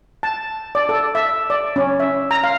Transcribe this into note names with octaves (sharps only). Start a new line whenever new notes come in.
A5
D5
A4
E5
D5
C#4
E5
A#5
F5